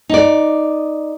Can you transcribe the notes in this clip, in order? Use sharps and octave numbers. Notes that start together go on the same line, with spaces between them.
D#4 D5